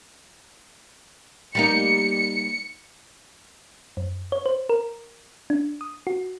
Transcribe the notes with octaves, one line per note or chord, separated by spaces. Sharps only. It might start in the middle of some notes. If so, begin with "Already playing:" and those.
G3 A#3 D#4 C#7
F#2
C#5
C5
A#4
D4
D#6
F#4